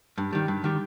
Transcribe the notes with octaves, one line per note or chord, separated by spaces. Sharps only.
G2
D#3 G3
G2
D#3 G3